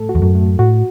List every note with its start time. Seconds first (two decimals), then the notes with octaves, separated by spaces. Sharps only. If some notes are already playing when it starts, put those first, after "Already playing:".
Already playing: A2 A3 A4
0.09 F#4
0.15 E2
0.22 F#2
0.35 A3
0.59 A2 F#4